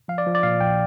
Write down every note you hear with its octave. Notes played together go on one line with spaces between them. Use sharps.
F3 F5
D5
F3
D5
A#2 F5
A#1 G5